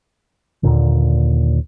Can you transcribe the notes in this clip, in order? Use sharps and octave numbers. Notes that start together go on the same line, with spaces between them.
D#2 A#2 D3